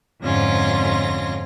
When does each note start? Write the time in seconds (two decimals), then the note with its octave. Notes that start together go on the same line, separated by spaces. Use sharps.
0.22 F2 G#2 D3 C#4 F4 A#6